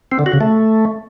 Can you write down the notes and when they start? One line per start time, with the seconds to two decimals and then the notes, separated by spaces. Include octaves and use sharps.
0.12 C4
0.19 D3
0.26 F#4
0.33 C#3
0.41 A3